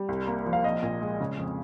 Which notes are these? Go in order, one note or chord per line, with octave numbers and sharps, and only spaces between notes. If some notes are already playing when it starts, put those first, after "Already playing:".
Already playing: G3
C2
A#3
F3
F5
A#1 D#5
A#2
G#3
C#3
F2